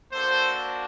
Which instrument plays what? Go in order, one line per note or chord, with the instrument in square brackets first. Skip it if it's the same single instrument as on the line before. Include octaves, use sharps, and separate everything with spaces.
[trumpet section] A#3 D4 F#4 A4 C5